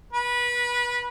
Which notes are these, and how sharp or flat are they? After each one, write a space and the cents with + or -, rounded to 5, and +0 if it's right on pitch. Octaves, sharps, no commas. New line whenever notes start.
B4 -20